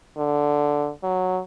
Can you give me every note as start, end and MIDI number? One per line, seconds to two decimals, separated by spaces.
0.17 0.90 50
1.03 1.41 54